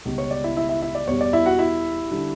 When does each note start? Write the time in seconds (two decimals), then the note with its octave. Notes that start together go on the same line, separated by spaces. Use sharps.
0.05 C#2 B2 G3
0.18 C#5
0.31 D5
0.44 E4 E5
0.56 E4 E5
0.69 E4 E5
0.82 E4 E5
0.95 D5
1.07 E2 B2 G3 C#5
1.21 D5
1.33 E4 E5
1.46 F#4 F#5
1.59 E4 E5
2.11 D3 G3